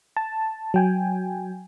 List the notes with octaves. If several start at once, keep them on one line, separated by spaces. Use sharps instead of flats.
A5
F#3 G5 G#5